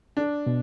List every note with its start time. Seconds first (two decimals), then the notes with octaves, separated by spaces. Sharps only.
0.17 D4
0.46 B2